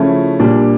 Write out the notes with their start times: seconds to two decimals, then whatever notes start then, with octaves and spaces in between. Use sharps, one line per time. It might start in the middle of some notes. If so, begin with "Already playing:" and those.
Already playing: C#3 F3 A3 C#4 E4
0.39 A#2 G3 D4